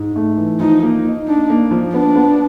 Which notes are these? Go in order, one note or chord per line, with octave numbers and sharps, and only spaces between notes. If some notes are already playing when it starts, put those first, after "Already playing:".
Already playing: G#2
A3
E3
F3 D#4
A#3
D#4
D4 D#4
A#3
F3
B3 D4
B3